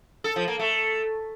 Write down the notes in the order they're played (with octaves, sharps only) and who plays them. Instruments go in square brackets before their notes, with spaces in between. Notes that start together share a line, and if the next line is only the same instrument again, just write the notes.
[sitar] A4
F3
A#3
A3